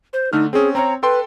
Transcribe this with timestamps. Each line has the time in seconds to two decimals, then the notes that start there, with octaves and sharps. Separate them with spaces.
0.13 C5
0.33 D3 A3 D#4 F6
0.53 C4 C#4 G#4
0.75 C4 C#5 A#5
1.03 A4 B4 G5 C6